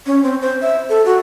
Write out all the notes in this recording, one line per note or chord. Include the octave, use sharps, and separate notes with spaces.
C#4
C4
C5
E5
A4
F#4